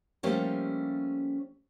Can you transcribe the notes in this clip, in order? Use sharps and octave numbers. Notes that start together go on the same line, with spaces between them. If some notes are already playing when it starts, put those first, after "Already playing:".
F3 G3 A3 A#3 C#4 G4